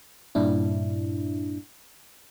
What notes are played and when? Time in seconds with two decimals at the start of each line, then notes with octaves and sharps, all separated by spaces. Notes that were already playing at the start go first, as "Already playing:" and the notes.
0.35 G2 A#2 D4 E4